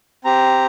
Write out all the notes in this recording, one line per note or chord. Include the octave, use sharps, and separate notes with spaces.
C4 G4 A#5